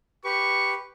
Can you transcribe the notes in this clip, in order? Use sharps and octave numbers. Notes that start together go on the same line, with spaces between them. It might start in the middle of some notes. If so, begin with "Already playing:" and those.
G4 B4 C#6